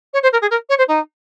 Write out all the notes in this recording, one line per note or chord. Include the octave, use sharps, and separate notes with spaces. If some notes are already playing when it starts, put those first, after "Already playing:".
C#5
C5
A#4
G#4
A#4
C#5
C5
D#4